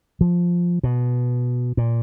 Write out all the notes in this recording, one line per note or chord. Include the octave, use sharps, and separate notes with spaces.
F3
B2
A#2